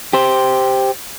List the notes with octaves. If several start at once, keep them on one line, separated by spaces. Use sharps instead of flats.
G4 C5